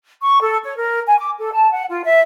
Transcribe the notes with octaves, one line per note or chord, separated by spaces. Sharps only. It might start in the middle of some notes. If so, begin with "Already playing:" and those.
C#6
A4
C#5
A#4
G#5
D6
A4
A5
F#5
F4
E5